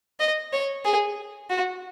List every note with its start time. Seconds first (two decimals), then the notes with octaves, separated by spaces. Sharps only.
0.20 D#5
0.53 C#5
0.85 G#4
1.50 F#4